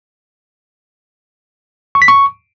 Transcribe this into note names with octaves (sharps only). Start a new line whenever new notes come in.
C#6
B6
C#6